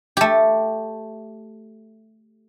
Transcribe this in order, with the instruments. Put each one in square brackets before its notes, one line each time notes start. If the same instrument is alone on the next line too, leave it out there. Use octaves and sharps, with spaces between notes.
[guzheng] A3 G4